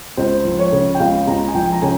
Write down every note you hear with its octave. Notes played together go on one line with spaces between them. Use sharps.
C#2 C5
F3
C#5
C#3
G5
C#2 F5
C#2 A#5
G#5
F3 G5
A#5
C#3 G#5